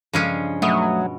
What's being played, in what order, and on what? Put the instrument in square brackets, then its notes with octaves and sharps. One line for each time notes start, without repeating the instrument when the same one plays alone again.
[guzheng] G2 F3 [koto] C#3 G#3 C#4
[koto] B2 [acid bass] F#3 [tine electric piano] A3 E5 D#6